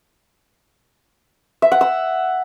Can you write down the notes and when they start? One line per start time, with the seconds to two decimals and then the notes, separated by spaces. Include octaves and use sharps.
1.62 E5
1.72 F#5
1.81 E6